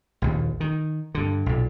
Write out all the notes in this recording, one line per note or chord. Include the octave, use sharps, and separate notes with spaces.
A#1 D#2
D#3
G2 D3
B1 A#2